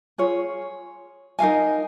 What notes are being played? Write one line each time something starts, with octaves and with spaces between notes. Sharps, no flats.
F4 G#4 C#5
D#4 A#4 F5 G#5